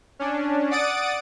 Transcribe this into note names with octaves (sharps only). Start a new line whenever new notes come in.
C#4 D4
D5 F#5 D#6 A6 D7